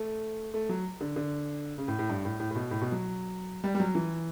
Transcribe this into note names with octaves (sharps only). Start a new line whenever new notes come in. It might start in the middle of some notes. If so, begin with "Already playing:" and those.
Already playing: A3
A3
F#3
D3
D3
C#3
A2
A2
G2
A2
A2
A2
B2
A2
B2
F#3
G3
G3
F#3
E3